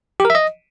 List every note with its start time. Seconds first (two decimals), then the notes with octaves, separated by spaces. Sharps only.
0.20 G4
0.25 A#4
0.30 E5
0.35 D#5